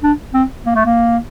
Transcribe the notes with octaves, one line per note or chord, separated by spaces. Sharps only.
D4
C4
A#3
A3
A#3